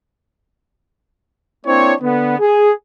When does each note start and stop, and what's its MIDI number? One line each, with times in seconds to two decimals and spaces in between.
1.66 1.93 58
1.66 1.93 60
1.66 1.93 62
1.66 1.93 64
1.66 1.93 72
1.66 1.93 73
2.01 2.38 50
2.01 2.38 59
2.39 2.72 68